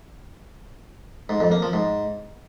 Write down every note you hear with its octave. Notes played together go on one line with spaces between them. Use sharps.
G#2
F2
A#3
F3
G#2